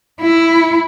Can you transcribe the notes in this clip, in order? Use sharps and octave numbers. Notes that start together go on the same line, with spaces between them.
E4